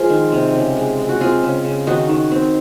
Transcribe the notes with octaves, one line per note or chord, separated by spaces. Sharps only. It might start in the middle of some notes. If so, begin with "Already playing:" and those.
Already playing: F3 G#3 A#3 F4 G#4
D#3
C3
C#3
G#3
G#3
F#4
C4 F4 G#4
C#3
C#3
D#3 D#4 F#4
D#3
C4